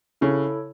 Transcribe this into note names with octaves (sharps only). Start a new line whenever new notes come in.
C#3 E4 A4 C#5